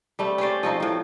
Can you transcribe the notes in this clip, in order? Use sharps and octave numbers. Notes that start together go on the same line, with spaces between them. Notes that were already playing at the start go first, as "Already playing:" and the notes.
G3 A3 C4
C#4 G4 C5 D5
F3 C4 D#4
A2 F3